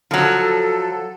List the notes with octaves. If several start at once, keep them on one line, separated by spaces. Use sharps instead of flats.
F3 F#3 A4